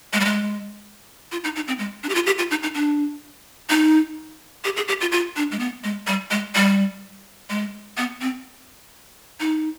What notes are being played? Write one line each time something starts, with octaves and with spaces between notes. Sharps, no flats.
G#3
G3
G#3
F4
D#4
D#4
C4
G#3
D4
G4
F4
G4
F4
D#4
D#4
D4
D#4
G4
G#4
G4
F4
F4
D4
G#3
B3
G#3
G3
G#3
G3
G#3
B3
C4
D#4